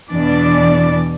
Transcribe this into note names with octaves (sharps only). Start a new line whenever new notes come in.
E2 B2 E3 D4 D5